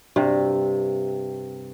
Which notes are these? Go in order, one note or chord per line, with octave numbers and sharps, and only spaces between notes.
G2 C3